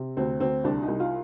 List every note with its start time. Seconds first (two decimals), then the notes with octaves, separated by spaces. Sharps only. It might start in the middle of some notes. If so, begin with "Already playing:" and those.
Already playing: C3
0.17 D2 C4
0.40 D2 C4
0.64 C2 D4
0.82 D#4
0.88 C2
1.00 F4